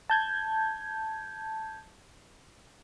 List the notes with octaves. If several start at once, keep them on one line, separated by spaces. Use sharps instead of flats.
A5 G6 G#6